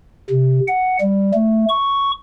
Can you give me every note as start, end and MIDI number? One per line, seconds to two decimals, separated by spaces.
0.30 0.60 48
0.68 0.97 78
1.01 1.32 55
1.34 1.65 57
1.68 2.11 85